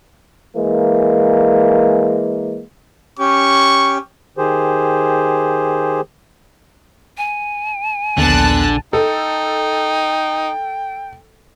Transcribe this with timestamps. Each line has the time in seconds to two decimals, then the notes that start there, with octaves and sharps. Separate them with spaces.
0.57 E3 G#3 A#3
3.19 C#4 G4 C#6
4.38 D#3 G4 G#4 C5
7.17 G#5
8.18 A#1 D#2 D3 B3 A5 F#6
8.93 D#4 A4 G5